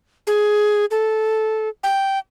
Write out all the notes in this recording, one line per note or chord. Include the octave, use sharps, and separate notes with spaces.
G#4
A4
G5